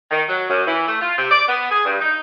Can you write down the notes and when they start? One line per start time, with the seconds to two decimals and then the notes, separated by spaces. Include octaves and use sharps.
0.11 D#3
0.28 F#3
0.50 F#2
0.66 E3
0.87 A3
1.00 F4
1.17 C3
1.31 D5
1.48 B3
1.70 G#4
1.85 G2
2.00 D#4